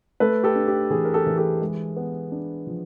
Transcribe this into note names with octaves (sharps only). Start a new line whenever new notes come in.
A3 A4 B4
G4 A4
D4
G4
E3 G#4
A#4
G4 A4
E3
G4 A4
G#3
B3
D4
F3